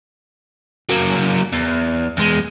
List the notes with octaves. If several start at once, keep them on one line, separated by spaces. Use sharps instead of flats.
F#3 A#3
E2
E2 G#3